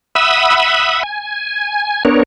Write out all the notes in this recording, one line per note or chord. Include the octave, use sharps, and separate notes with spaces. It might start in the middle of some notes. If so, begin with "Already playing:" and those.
E5 F#5 B5 D#6 E6
G#5
B3 D4 A#4 C#5